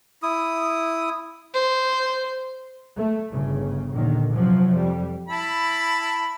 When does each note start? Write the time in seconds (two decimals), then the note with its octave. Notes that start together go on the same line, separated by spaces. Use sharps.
0.23 E4 D#6
1.54 C5
2.97 A3
3.29 G1 C#3
3.92 A#1 D#2 D3 D#3
4.32 F#2 C3 F3 F#3
4.72 F2 G3
5.29 E4 A5 B5